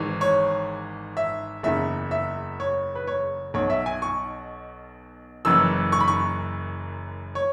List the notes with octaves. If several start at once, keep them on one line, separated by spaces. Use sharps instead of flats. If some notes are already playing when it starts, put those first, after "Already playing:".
Already playing: G#1 G#2 E3
C#5
E5
F#1 E2 C#3 E5
E5
C#5
B4
C#5
B1 B2 C#5
E5
G#5
C#6
F#1 F#2 E3 E6
C#6
B5
C#6
C#5